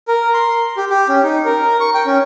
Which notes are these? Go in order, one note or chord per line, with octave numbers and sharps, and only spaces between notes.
A#4
C6
G4
G4
C#4
D#4
A#4
C#6
G5
C#4